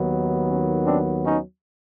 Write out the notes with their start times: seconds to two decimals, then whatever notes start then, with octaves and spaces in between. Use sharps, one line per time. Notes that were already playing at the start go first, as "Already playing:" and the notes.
Already playing: D#2 D#3 F#3 B3
0.47 C#4
0.85 C4 D4
1.25 C#4 D#4